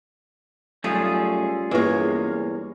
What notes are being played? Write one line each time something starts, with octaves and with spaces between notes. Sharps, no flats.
F#2 G3 A3 C#4 F4 G#4
E2 G2 G#3 A#3 C#5